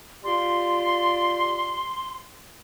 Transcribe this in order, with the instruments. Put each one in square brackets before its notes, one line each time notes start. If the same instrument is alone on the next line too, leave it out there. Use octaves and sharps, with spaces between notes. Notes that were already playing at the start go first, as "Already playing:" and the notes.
[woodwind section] F4 G4 D5 [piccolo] C6